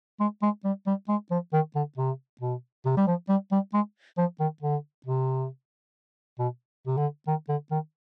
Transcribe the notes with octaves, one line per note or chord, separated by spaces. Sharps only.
G#3
G#3
G3
G3
G#3
F3
D#3
D3
C3
B2
C3
G3
F3
G3
G3
G#3
F3
D#3
D3
C3
B2
C3
D3
D#3
D3
D#3